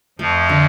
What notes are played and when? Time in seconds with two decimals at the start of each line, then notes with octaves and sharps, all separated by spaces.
0.19 F2 F3 A3
0.49 D3